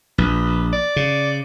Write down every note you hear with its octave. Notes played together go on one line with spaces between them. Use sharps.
A#1 B4
D5
C#3